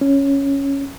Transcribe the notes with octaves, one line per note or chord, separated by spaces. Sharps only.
C#4